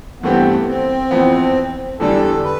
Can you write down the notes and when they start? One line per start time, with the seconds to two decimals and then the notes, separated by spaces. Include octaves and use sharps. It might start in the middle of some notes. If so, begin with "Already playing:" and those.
0.22 G2 E3 A3 B3 C4 G4
0.67 C4
1.11 F2 E3 B3
2.00 E2 D3 G3 D4 A4
2.44 B4